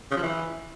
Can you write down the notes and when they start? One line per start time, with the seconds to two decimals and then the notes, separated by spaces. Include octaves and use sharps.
0.11 C#3
0.17 F3
0.23 E3